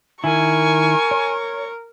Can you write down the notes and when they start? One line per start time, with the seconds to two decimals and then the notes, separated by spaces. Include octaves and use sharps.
0.24 D#3 E4 A#4 G#5 C#6
1.11 C#5